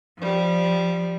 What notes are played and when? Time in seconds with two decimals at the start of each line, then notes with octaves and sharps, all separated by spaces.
0.17 F3 G3